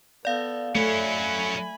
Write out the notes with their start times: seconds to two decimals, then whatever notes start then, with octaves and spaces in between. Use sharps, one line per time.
0.25 B3 A4 D5 F5
0.75 F#3 A3 C#4 G#5 B5